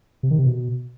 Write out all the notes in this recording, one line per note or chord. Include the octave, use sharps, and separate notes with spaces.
C3
D#3
C3
B2